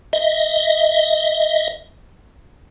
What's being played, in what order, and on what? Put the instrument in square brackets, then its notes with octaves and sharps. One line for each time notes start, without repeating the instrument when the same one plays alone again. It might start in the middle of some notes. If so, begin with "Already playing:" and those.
[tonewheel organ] D#5 E5